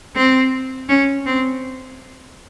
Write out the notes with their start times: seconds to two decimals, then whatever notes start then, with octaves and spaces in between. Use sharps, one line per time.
0.16 C4
0.89 C#4
1.26 C4